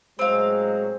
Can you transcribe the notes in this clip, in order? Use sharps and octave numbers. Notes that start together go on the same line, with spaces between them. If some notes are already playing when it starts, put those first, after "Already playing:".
A2 F#3 G#3 C4 F5